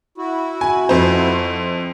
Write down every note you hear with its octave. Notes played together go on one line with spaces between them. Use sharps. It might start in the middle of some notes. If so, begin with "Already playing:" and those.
E4 F#4
G#5
F2 C5